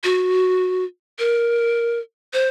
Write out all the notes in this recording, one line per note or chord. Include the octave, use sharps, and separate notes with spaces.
F#4
A#4
C5